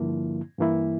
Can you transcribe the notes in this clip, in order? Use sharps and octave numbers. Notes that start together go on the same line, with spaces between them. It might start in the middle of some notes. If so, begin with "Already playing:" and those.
Already playing: G2 D3 F3 A#3 E4
G2 E3 A#3 E4